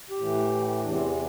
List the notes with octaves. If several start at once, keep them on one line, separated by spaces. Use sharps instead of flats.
G4
A2 E3
E2 C3 E3 D4
C4
B3